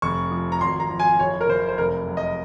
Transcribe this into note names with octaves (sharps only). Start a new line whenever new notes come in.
F1 C#6
F3
A#5
G#1 C6
A#5
F3
G#5
F#1 C#5
A#4
F#1 C5
C5
F1 A#4
F#3
D#5